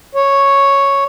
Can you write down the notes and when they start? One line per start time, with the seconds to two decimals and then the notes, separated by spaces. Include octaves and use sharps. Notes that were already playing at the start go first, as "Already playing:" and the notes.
0.15 C#5